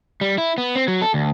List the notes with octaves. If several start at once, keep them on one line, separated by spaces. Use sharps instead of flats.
G3
E4
B3
C4
F#3
A4
D2